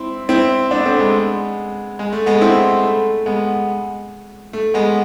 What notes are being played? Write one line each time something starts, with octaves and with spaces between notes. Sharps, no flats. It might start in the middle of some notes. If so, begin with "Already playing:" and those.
Already playing: C4 E4
C4 E4
B3 D4
A3 C4
G#3 B3
G#3
A3
G#3 B3
C4 E4
A3
G#3 B3
A3
G#3 B3